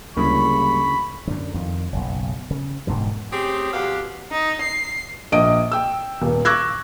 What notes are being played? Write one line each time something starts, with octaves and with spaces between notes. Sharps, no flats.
D2 C#3 F#3 G3 A#3 E4 B5 C#6
F#2 D3
F2 D#3
F#1 B1
C#3
E1 G#2 B2 D3
A3 C4 C#4 G4 G#4
F2 B2 G3 G4 F5 F#5
D#4
C7
A#1 D#5 D#6 D7
G5 E6
D#1
C#6 D6 E6 F#6 G#6 A#6